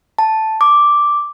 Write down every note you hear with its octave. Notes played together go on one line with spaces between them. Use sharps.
A5
D6